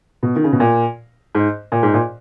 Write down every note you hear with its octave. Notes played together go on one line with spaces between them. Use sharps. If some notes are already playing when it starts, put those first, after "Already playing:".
B2
D#3
C#3
B2
A#2
G#2
A#2
G#2
A#2